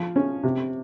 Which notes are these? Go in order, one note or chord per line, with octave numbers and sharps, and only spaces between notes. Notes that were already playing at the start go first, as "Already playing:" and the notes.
Already playing: F3
C#4
C3